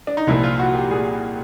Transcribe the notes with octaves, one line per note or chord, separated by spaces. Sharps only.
D4
D#4
C2 A#2 F3 E4
F4
F#4
G4
A#2 G#4